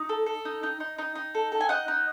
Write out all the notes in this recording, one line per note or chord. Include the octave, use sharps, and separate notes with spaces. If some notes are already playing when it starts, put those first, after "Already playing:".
Already playing: D#4
A4
A4
D#4
D#4
D#4
D#4
D#4
A4
A4
G#5
D#4 D#5 F#5
D#4